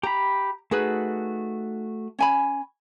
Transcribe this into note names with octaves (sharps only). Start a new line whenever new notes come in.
G4 A#5 B5
A3 D#4 F#4 G#4 B4
C#4 G#5 B5